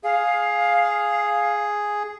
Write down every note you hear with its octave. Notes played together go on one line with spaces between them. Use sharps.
G#4 F5